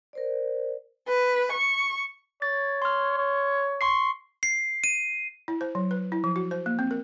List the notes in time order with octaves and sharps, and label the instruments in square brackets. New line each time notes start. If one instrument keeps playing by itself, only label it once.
[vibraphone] A#4 C5 D5
[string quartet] B4
C#6
[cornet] C#5 [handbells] A6
[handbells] C6 F6
[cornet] C#5
[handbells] C6 C#6 C7
[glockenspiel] C7
D#7
[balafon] E4
C5
F#3
B4
E4
F3
F#4
C5
A#3
C4
A#4